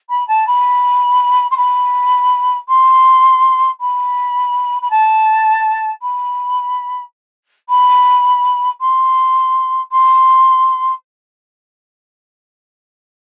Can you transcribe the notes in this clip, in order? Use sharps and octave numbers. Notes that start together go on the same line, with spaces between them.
B5
A5
B5
C6
B5
C6
B5
B5
A5
B5
B5
C6
C6